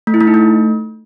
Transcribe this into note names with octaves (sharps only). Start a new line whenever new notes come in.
A3
E4
A3
D#4
A3